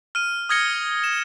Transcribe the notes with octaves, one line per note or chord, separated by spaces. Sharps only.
F6 D#7
D#6 F6 G#6 A#6 C#7 G7
E7